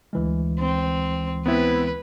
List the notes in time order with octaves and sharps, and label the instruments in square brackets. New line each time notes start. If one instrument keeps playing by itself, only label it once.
[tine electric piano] D2 E3 G#3
[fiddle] C4
[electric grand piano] B3 C4 E4 [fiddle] B4